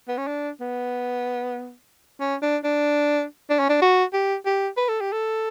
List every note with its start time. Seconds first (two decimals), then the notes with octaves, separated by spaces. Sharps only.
0.08 B3
0.17 C#4
0.27 D4
0.60 B3
2.20 C#4
2.42 D4
2.64 D4
3.50 D4
3.59 C#4
3.69 D4
3.82 F#4
4.13 G4
4.45 G4
4.77 B4
4.88 A4
5.00 G4
5.12 A4